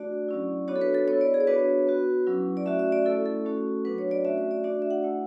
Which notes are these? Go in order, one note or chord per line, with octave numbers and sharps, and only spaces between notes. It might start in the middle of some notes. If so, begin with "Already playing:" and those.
Already playing: A3 D4 F#4 D5
F#3 C#4 E4
B3 D4 F#4 C#5
A4
B4
A4
B3 E4 C#5
D5
G#4
C#5
B3 D4 F#4 B4
B3 F#4
F#3 C#4 E4
D5
A3 C#4 F#4 E5
E5
D5
A3 C#4 E4 A4
A4
A3 C#4 F#4
F#3 B3 D4 F#4 B4
C#5
D5
A3 C#4 F#4 E5
E5
D5
A3 D4 F#4 D5
E5
F#5
A3 E4